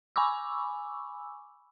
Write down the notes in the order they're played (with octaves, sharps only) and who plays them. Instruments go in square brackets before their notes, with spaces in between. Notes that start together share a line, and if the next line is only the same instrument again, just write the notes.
[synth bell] G#5 B5 C#6 D6 E6